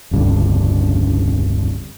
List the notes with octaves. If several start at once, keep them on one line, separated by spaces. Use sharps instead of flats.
E1 C#2 G2 D3